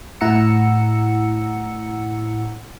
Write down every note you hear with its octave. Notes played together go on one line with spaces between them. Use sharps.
A2 E4 F#5 A#5 E6 C#7